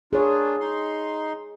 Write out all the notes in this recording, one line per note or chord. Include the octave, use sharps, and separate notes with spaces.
A#3 D4 F4 G#4 C#5
D#4 C6